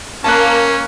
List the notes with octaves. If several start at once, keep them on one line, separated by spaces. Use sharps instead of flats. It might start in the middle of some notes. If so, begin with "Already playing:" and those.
A#3 C#4 A5 F#6